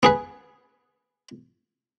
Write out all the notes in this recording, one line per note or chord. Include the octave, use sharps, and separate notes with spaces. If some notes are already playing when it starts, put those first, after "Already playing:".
B3 G#4 B4